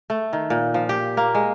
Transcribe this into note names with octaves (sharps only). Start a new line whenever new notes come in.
A3
D#3
A#2
F3
G4
A#3
G#3